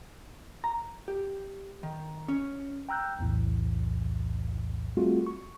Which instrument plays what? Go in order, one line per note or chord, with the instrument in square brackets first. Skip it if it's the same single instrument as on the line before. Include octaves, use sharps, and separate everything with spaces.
[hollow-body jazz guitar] A#5
G4
D#3
C#4
[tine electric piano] G5 A#5 E6 F#6 G6
B1 E2 A2 E3
G3 A3 C4 F4 F#4 G#4
C#6